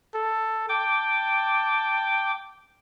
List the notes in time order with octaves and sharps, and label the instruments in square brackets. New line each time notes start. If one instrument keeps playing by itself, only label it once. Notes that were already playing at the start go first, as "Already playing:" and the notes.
[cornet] A4
[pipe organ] G5 D6 [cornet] A5